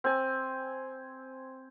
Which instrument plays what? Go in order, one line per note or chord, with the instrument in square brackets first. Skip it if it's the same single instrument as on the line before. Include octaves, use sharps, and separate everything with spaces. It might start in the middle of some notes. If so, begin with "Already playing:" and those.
[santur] C4 G#5